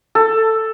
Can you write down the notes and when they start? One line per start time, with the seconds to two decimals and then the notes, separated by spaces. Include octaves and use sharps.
0.15 A4